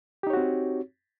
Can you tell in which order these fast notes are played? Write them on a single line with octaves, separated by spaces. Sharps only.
G4 D#4 C#5 F#4 C4